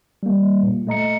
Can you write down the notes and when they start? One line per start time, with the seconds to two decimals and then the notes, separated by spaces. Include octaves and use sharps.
0.23 G3 A#3
0.63 A#2
0.87 A3 D#5 A#5 C#7